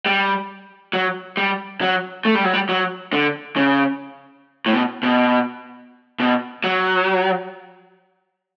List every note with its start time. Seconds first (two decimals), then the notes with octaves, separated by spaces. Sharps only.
0.06 G3
0.93 F#3
1.37 G3
1.81 F#3
2.25 A3
2.35 G3
2.44 F#3
2.54 G3
2.69 F#3
3.13 D3
3.56 C#3
4.66 A2
4.73 B2
5.03 B2
6.20 B2
6.64 F#3